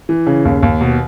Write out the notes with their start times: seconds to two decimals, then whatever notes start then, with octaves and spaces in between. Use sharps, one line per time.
0.09 E3
0.27 C#3
0.45 D#2
0.63 D#2
0.81 B2